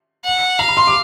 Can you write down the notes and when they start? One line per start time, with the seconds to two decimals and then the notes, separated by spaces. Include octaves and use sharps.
0.25 F#5
0.59 F5 A#5
0.68 B5
0.77 C6
0.87 D6